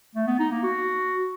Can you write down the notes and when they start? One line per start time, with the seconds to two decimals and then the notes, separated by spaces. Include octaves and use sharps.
0.15 A3
0.27 B3
0.39 D#4
0.51 A#3
0.63 F#4